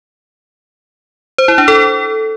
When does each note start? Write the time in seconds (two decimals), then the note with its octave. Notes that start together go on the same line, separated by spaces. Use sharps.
1.38 C5
1.48 E4
1.58 D4
1.68 A4